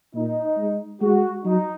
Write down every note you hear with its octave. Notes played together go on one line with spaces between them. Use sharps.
A#2 D#4
G#3
G#3 F#4
F#3 D#4